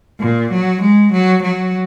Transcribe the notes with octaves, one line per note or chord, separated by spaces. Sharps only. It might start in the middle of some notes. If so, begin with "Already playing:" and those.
A#2
F#3
G#3
F#3
F#3